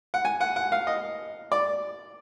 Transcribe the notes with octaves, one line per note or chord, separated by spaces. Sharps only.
F#5
G#5
F#5
F#5
F5
D#5
D5